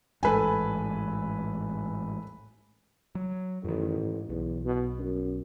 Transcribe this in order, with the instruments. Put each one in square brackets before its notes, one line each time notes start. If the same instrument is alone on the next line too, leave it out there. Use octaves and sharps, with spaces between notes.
[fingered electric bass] A1 G#2 [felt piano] A4 B4 G#5
[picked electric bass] F#3
[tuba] A1 [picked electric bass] F#2 D#3
[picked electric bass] G#2
[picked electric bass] B1 [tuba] E2
[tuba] B2
F#2